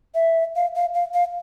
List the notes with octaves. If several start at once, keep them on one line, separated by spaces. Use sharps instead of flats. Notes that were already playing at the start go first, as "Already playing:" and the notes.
E5
F5
F5
F5
F5